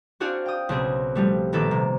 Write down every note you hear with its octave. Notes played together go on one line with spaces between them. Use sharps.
C4 D4 F#4 G#4 D5 F5
G5 D#6
B1 C#3 C4 C#4 G#4
F3 G3 A3
A#1 D#3 A#3 A4 B4 D6
C3 A#3